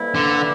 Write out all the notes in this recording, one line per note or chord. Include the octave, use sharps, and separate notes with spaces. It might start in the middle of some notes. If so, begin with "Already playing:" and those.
Already playing: F2 E3 G3 A#3 E4
D3